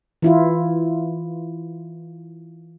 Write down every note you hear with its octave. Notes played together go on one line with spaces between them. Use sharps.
E3 E4 F4